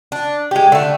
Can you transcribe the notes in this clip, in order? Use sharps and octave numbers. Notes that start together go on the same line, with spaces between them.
D4
G#3 G4
D3 A3